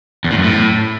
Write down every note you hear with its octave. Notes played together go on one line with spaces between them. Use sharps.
E2
A2
F#2
A2